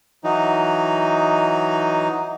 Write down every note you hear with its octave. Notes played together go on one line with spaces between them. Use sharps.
E3 F#3 D#4